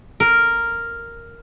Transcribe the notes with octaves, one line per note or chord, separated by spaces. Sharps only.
A#4